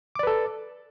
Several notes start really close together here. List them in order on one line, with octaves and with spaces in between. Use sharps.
D6 D5 B4 A4